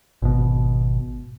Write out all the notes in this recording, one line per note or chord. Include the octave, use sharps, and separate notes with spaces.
G#1 B2